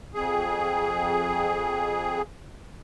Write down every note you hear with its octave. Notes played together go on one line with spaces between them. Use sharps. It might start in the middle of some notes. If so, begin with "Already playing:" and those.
F2 G#4